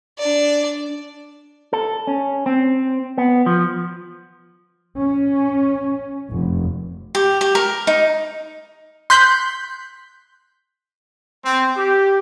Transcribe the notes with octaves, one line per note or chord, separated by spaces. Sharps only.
D4 D5
A4
C#4
C4
B3
F3
C#4
F1
G4
G4
A#4
D#4
C6 F#6 G6 B6
C4
G4